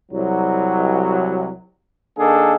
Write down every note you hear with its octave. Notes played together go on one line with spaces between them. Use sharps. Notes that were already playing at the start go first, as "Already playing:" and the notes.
C2 F#3
D#3 A#3 D4 G#4 A4